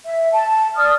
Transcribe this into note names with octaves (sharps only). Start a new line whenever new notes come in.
E5
A5
D5 D#6 F6